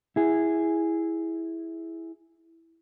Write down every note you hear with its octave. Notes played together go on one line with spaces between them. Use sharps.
E4 G#4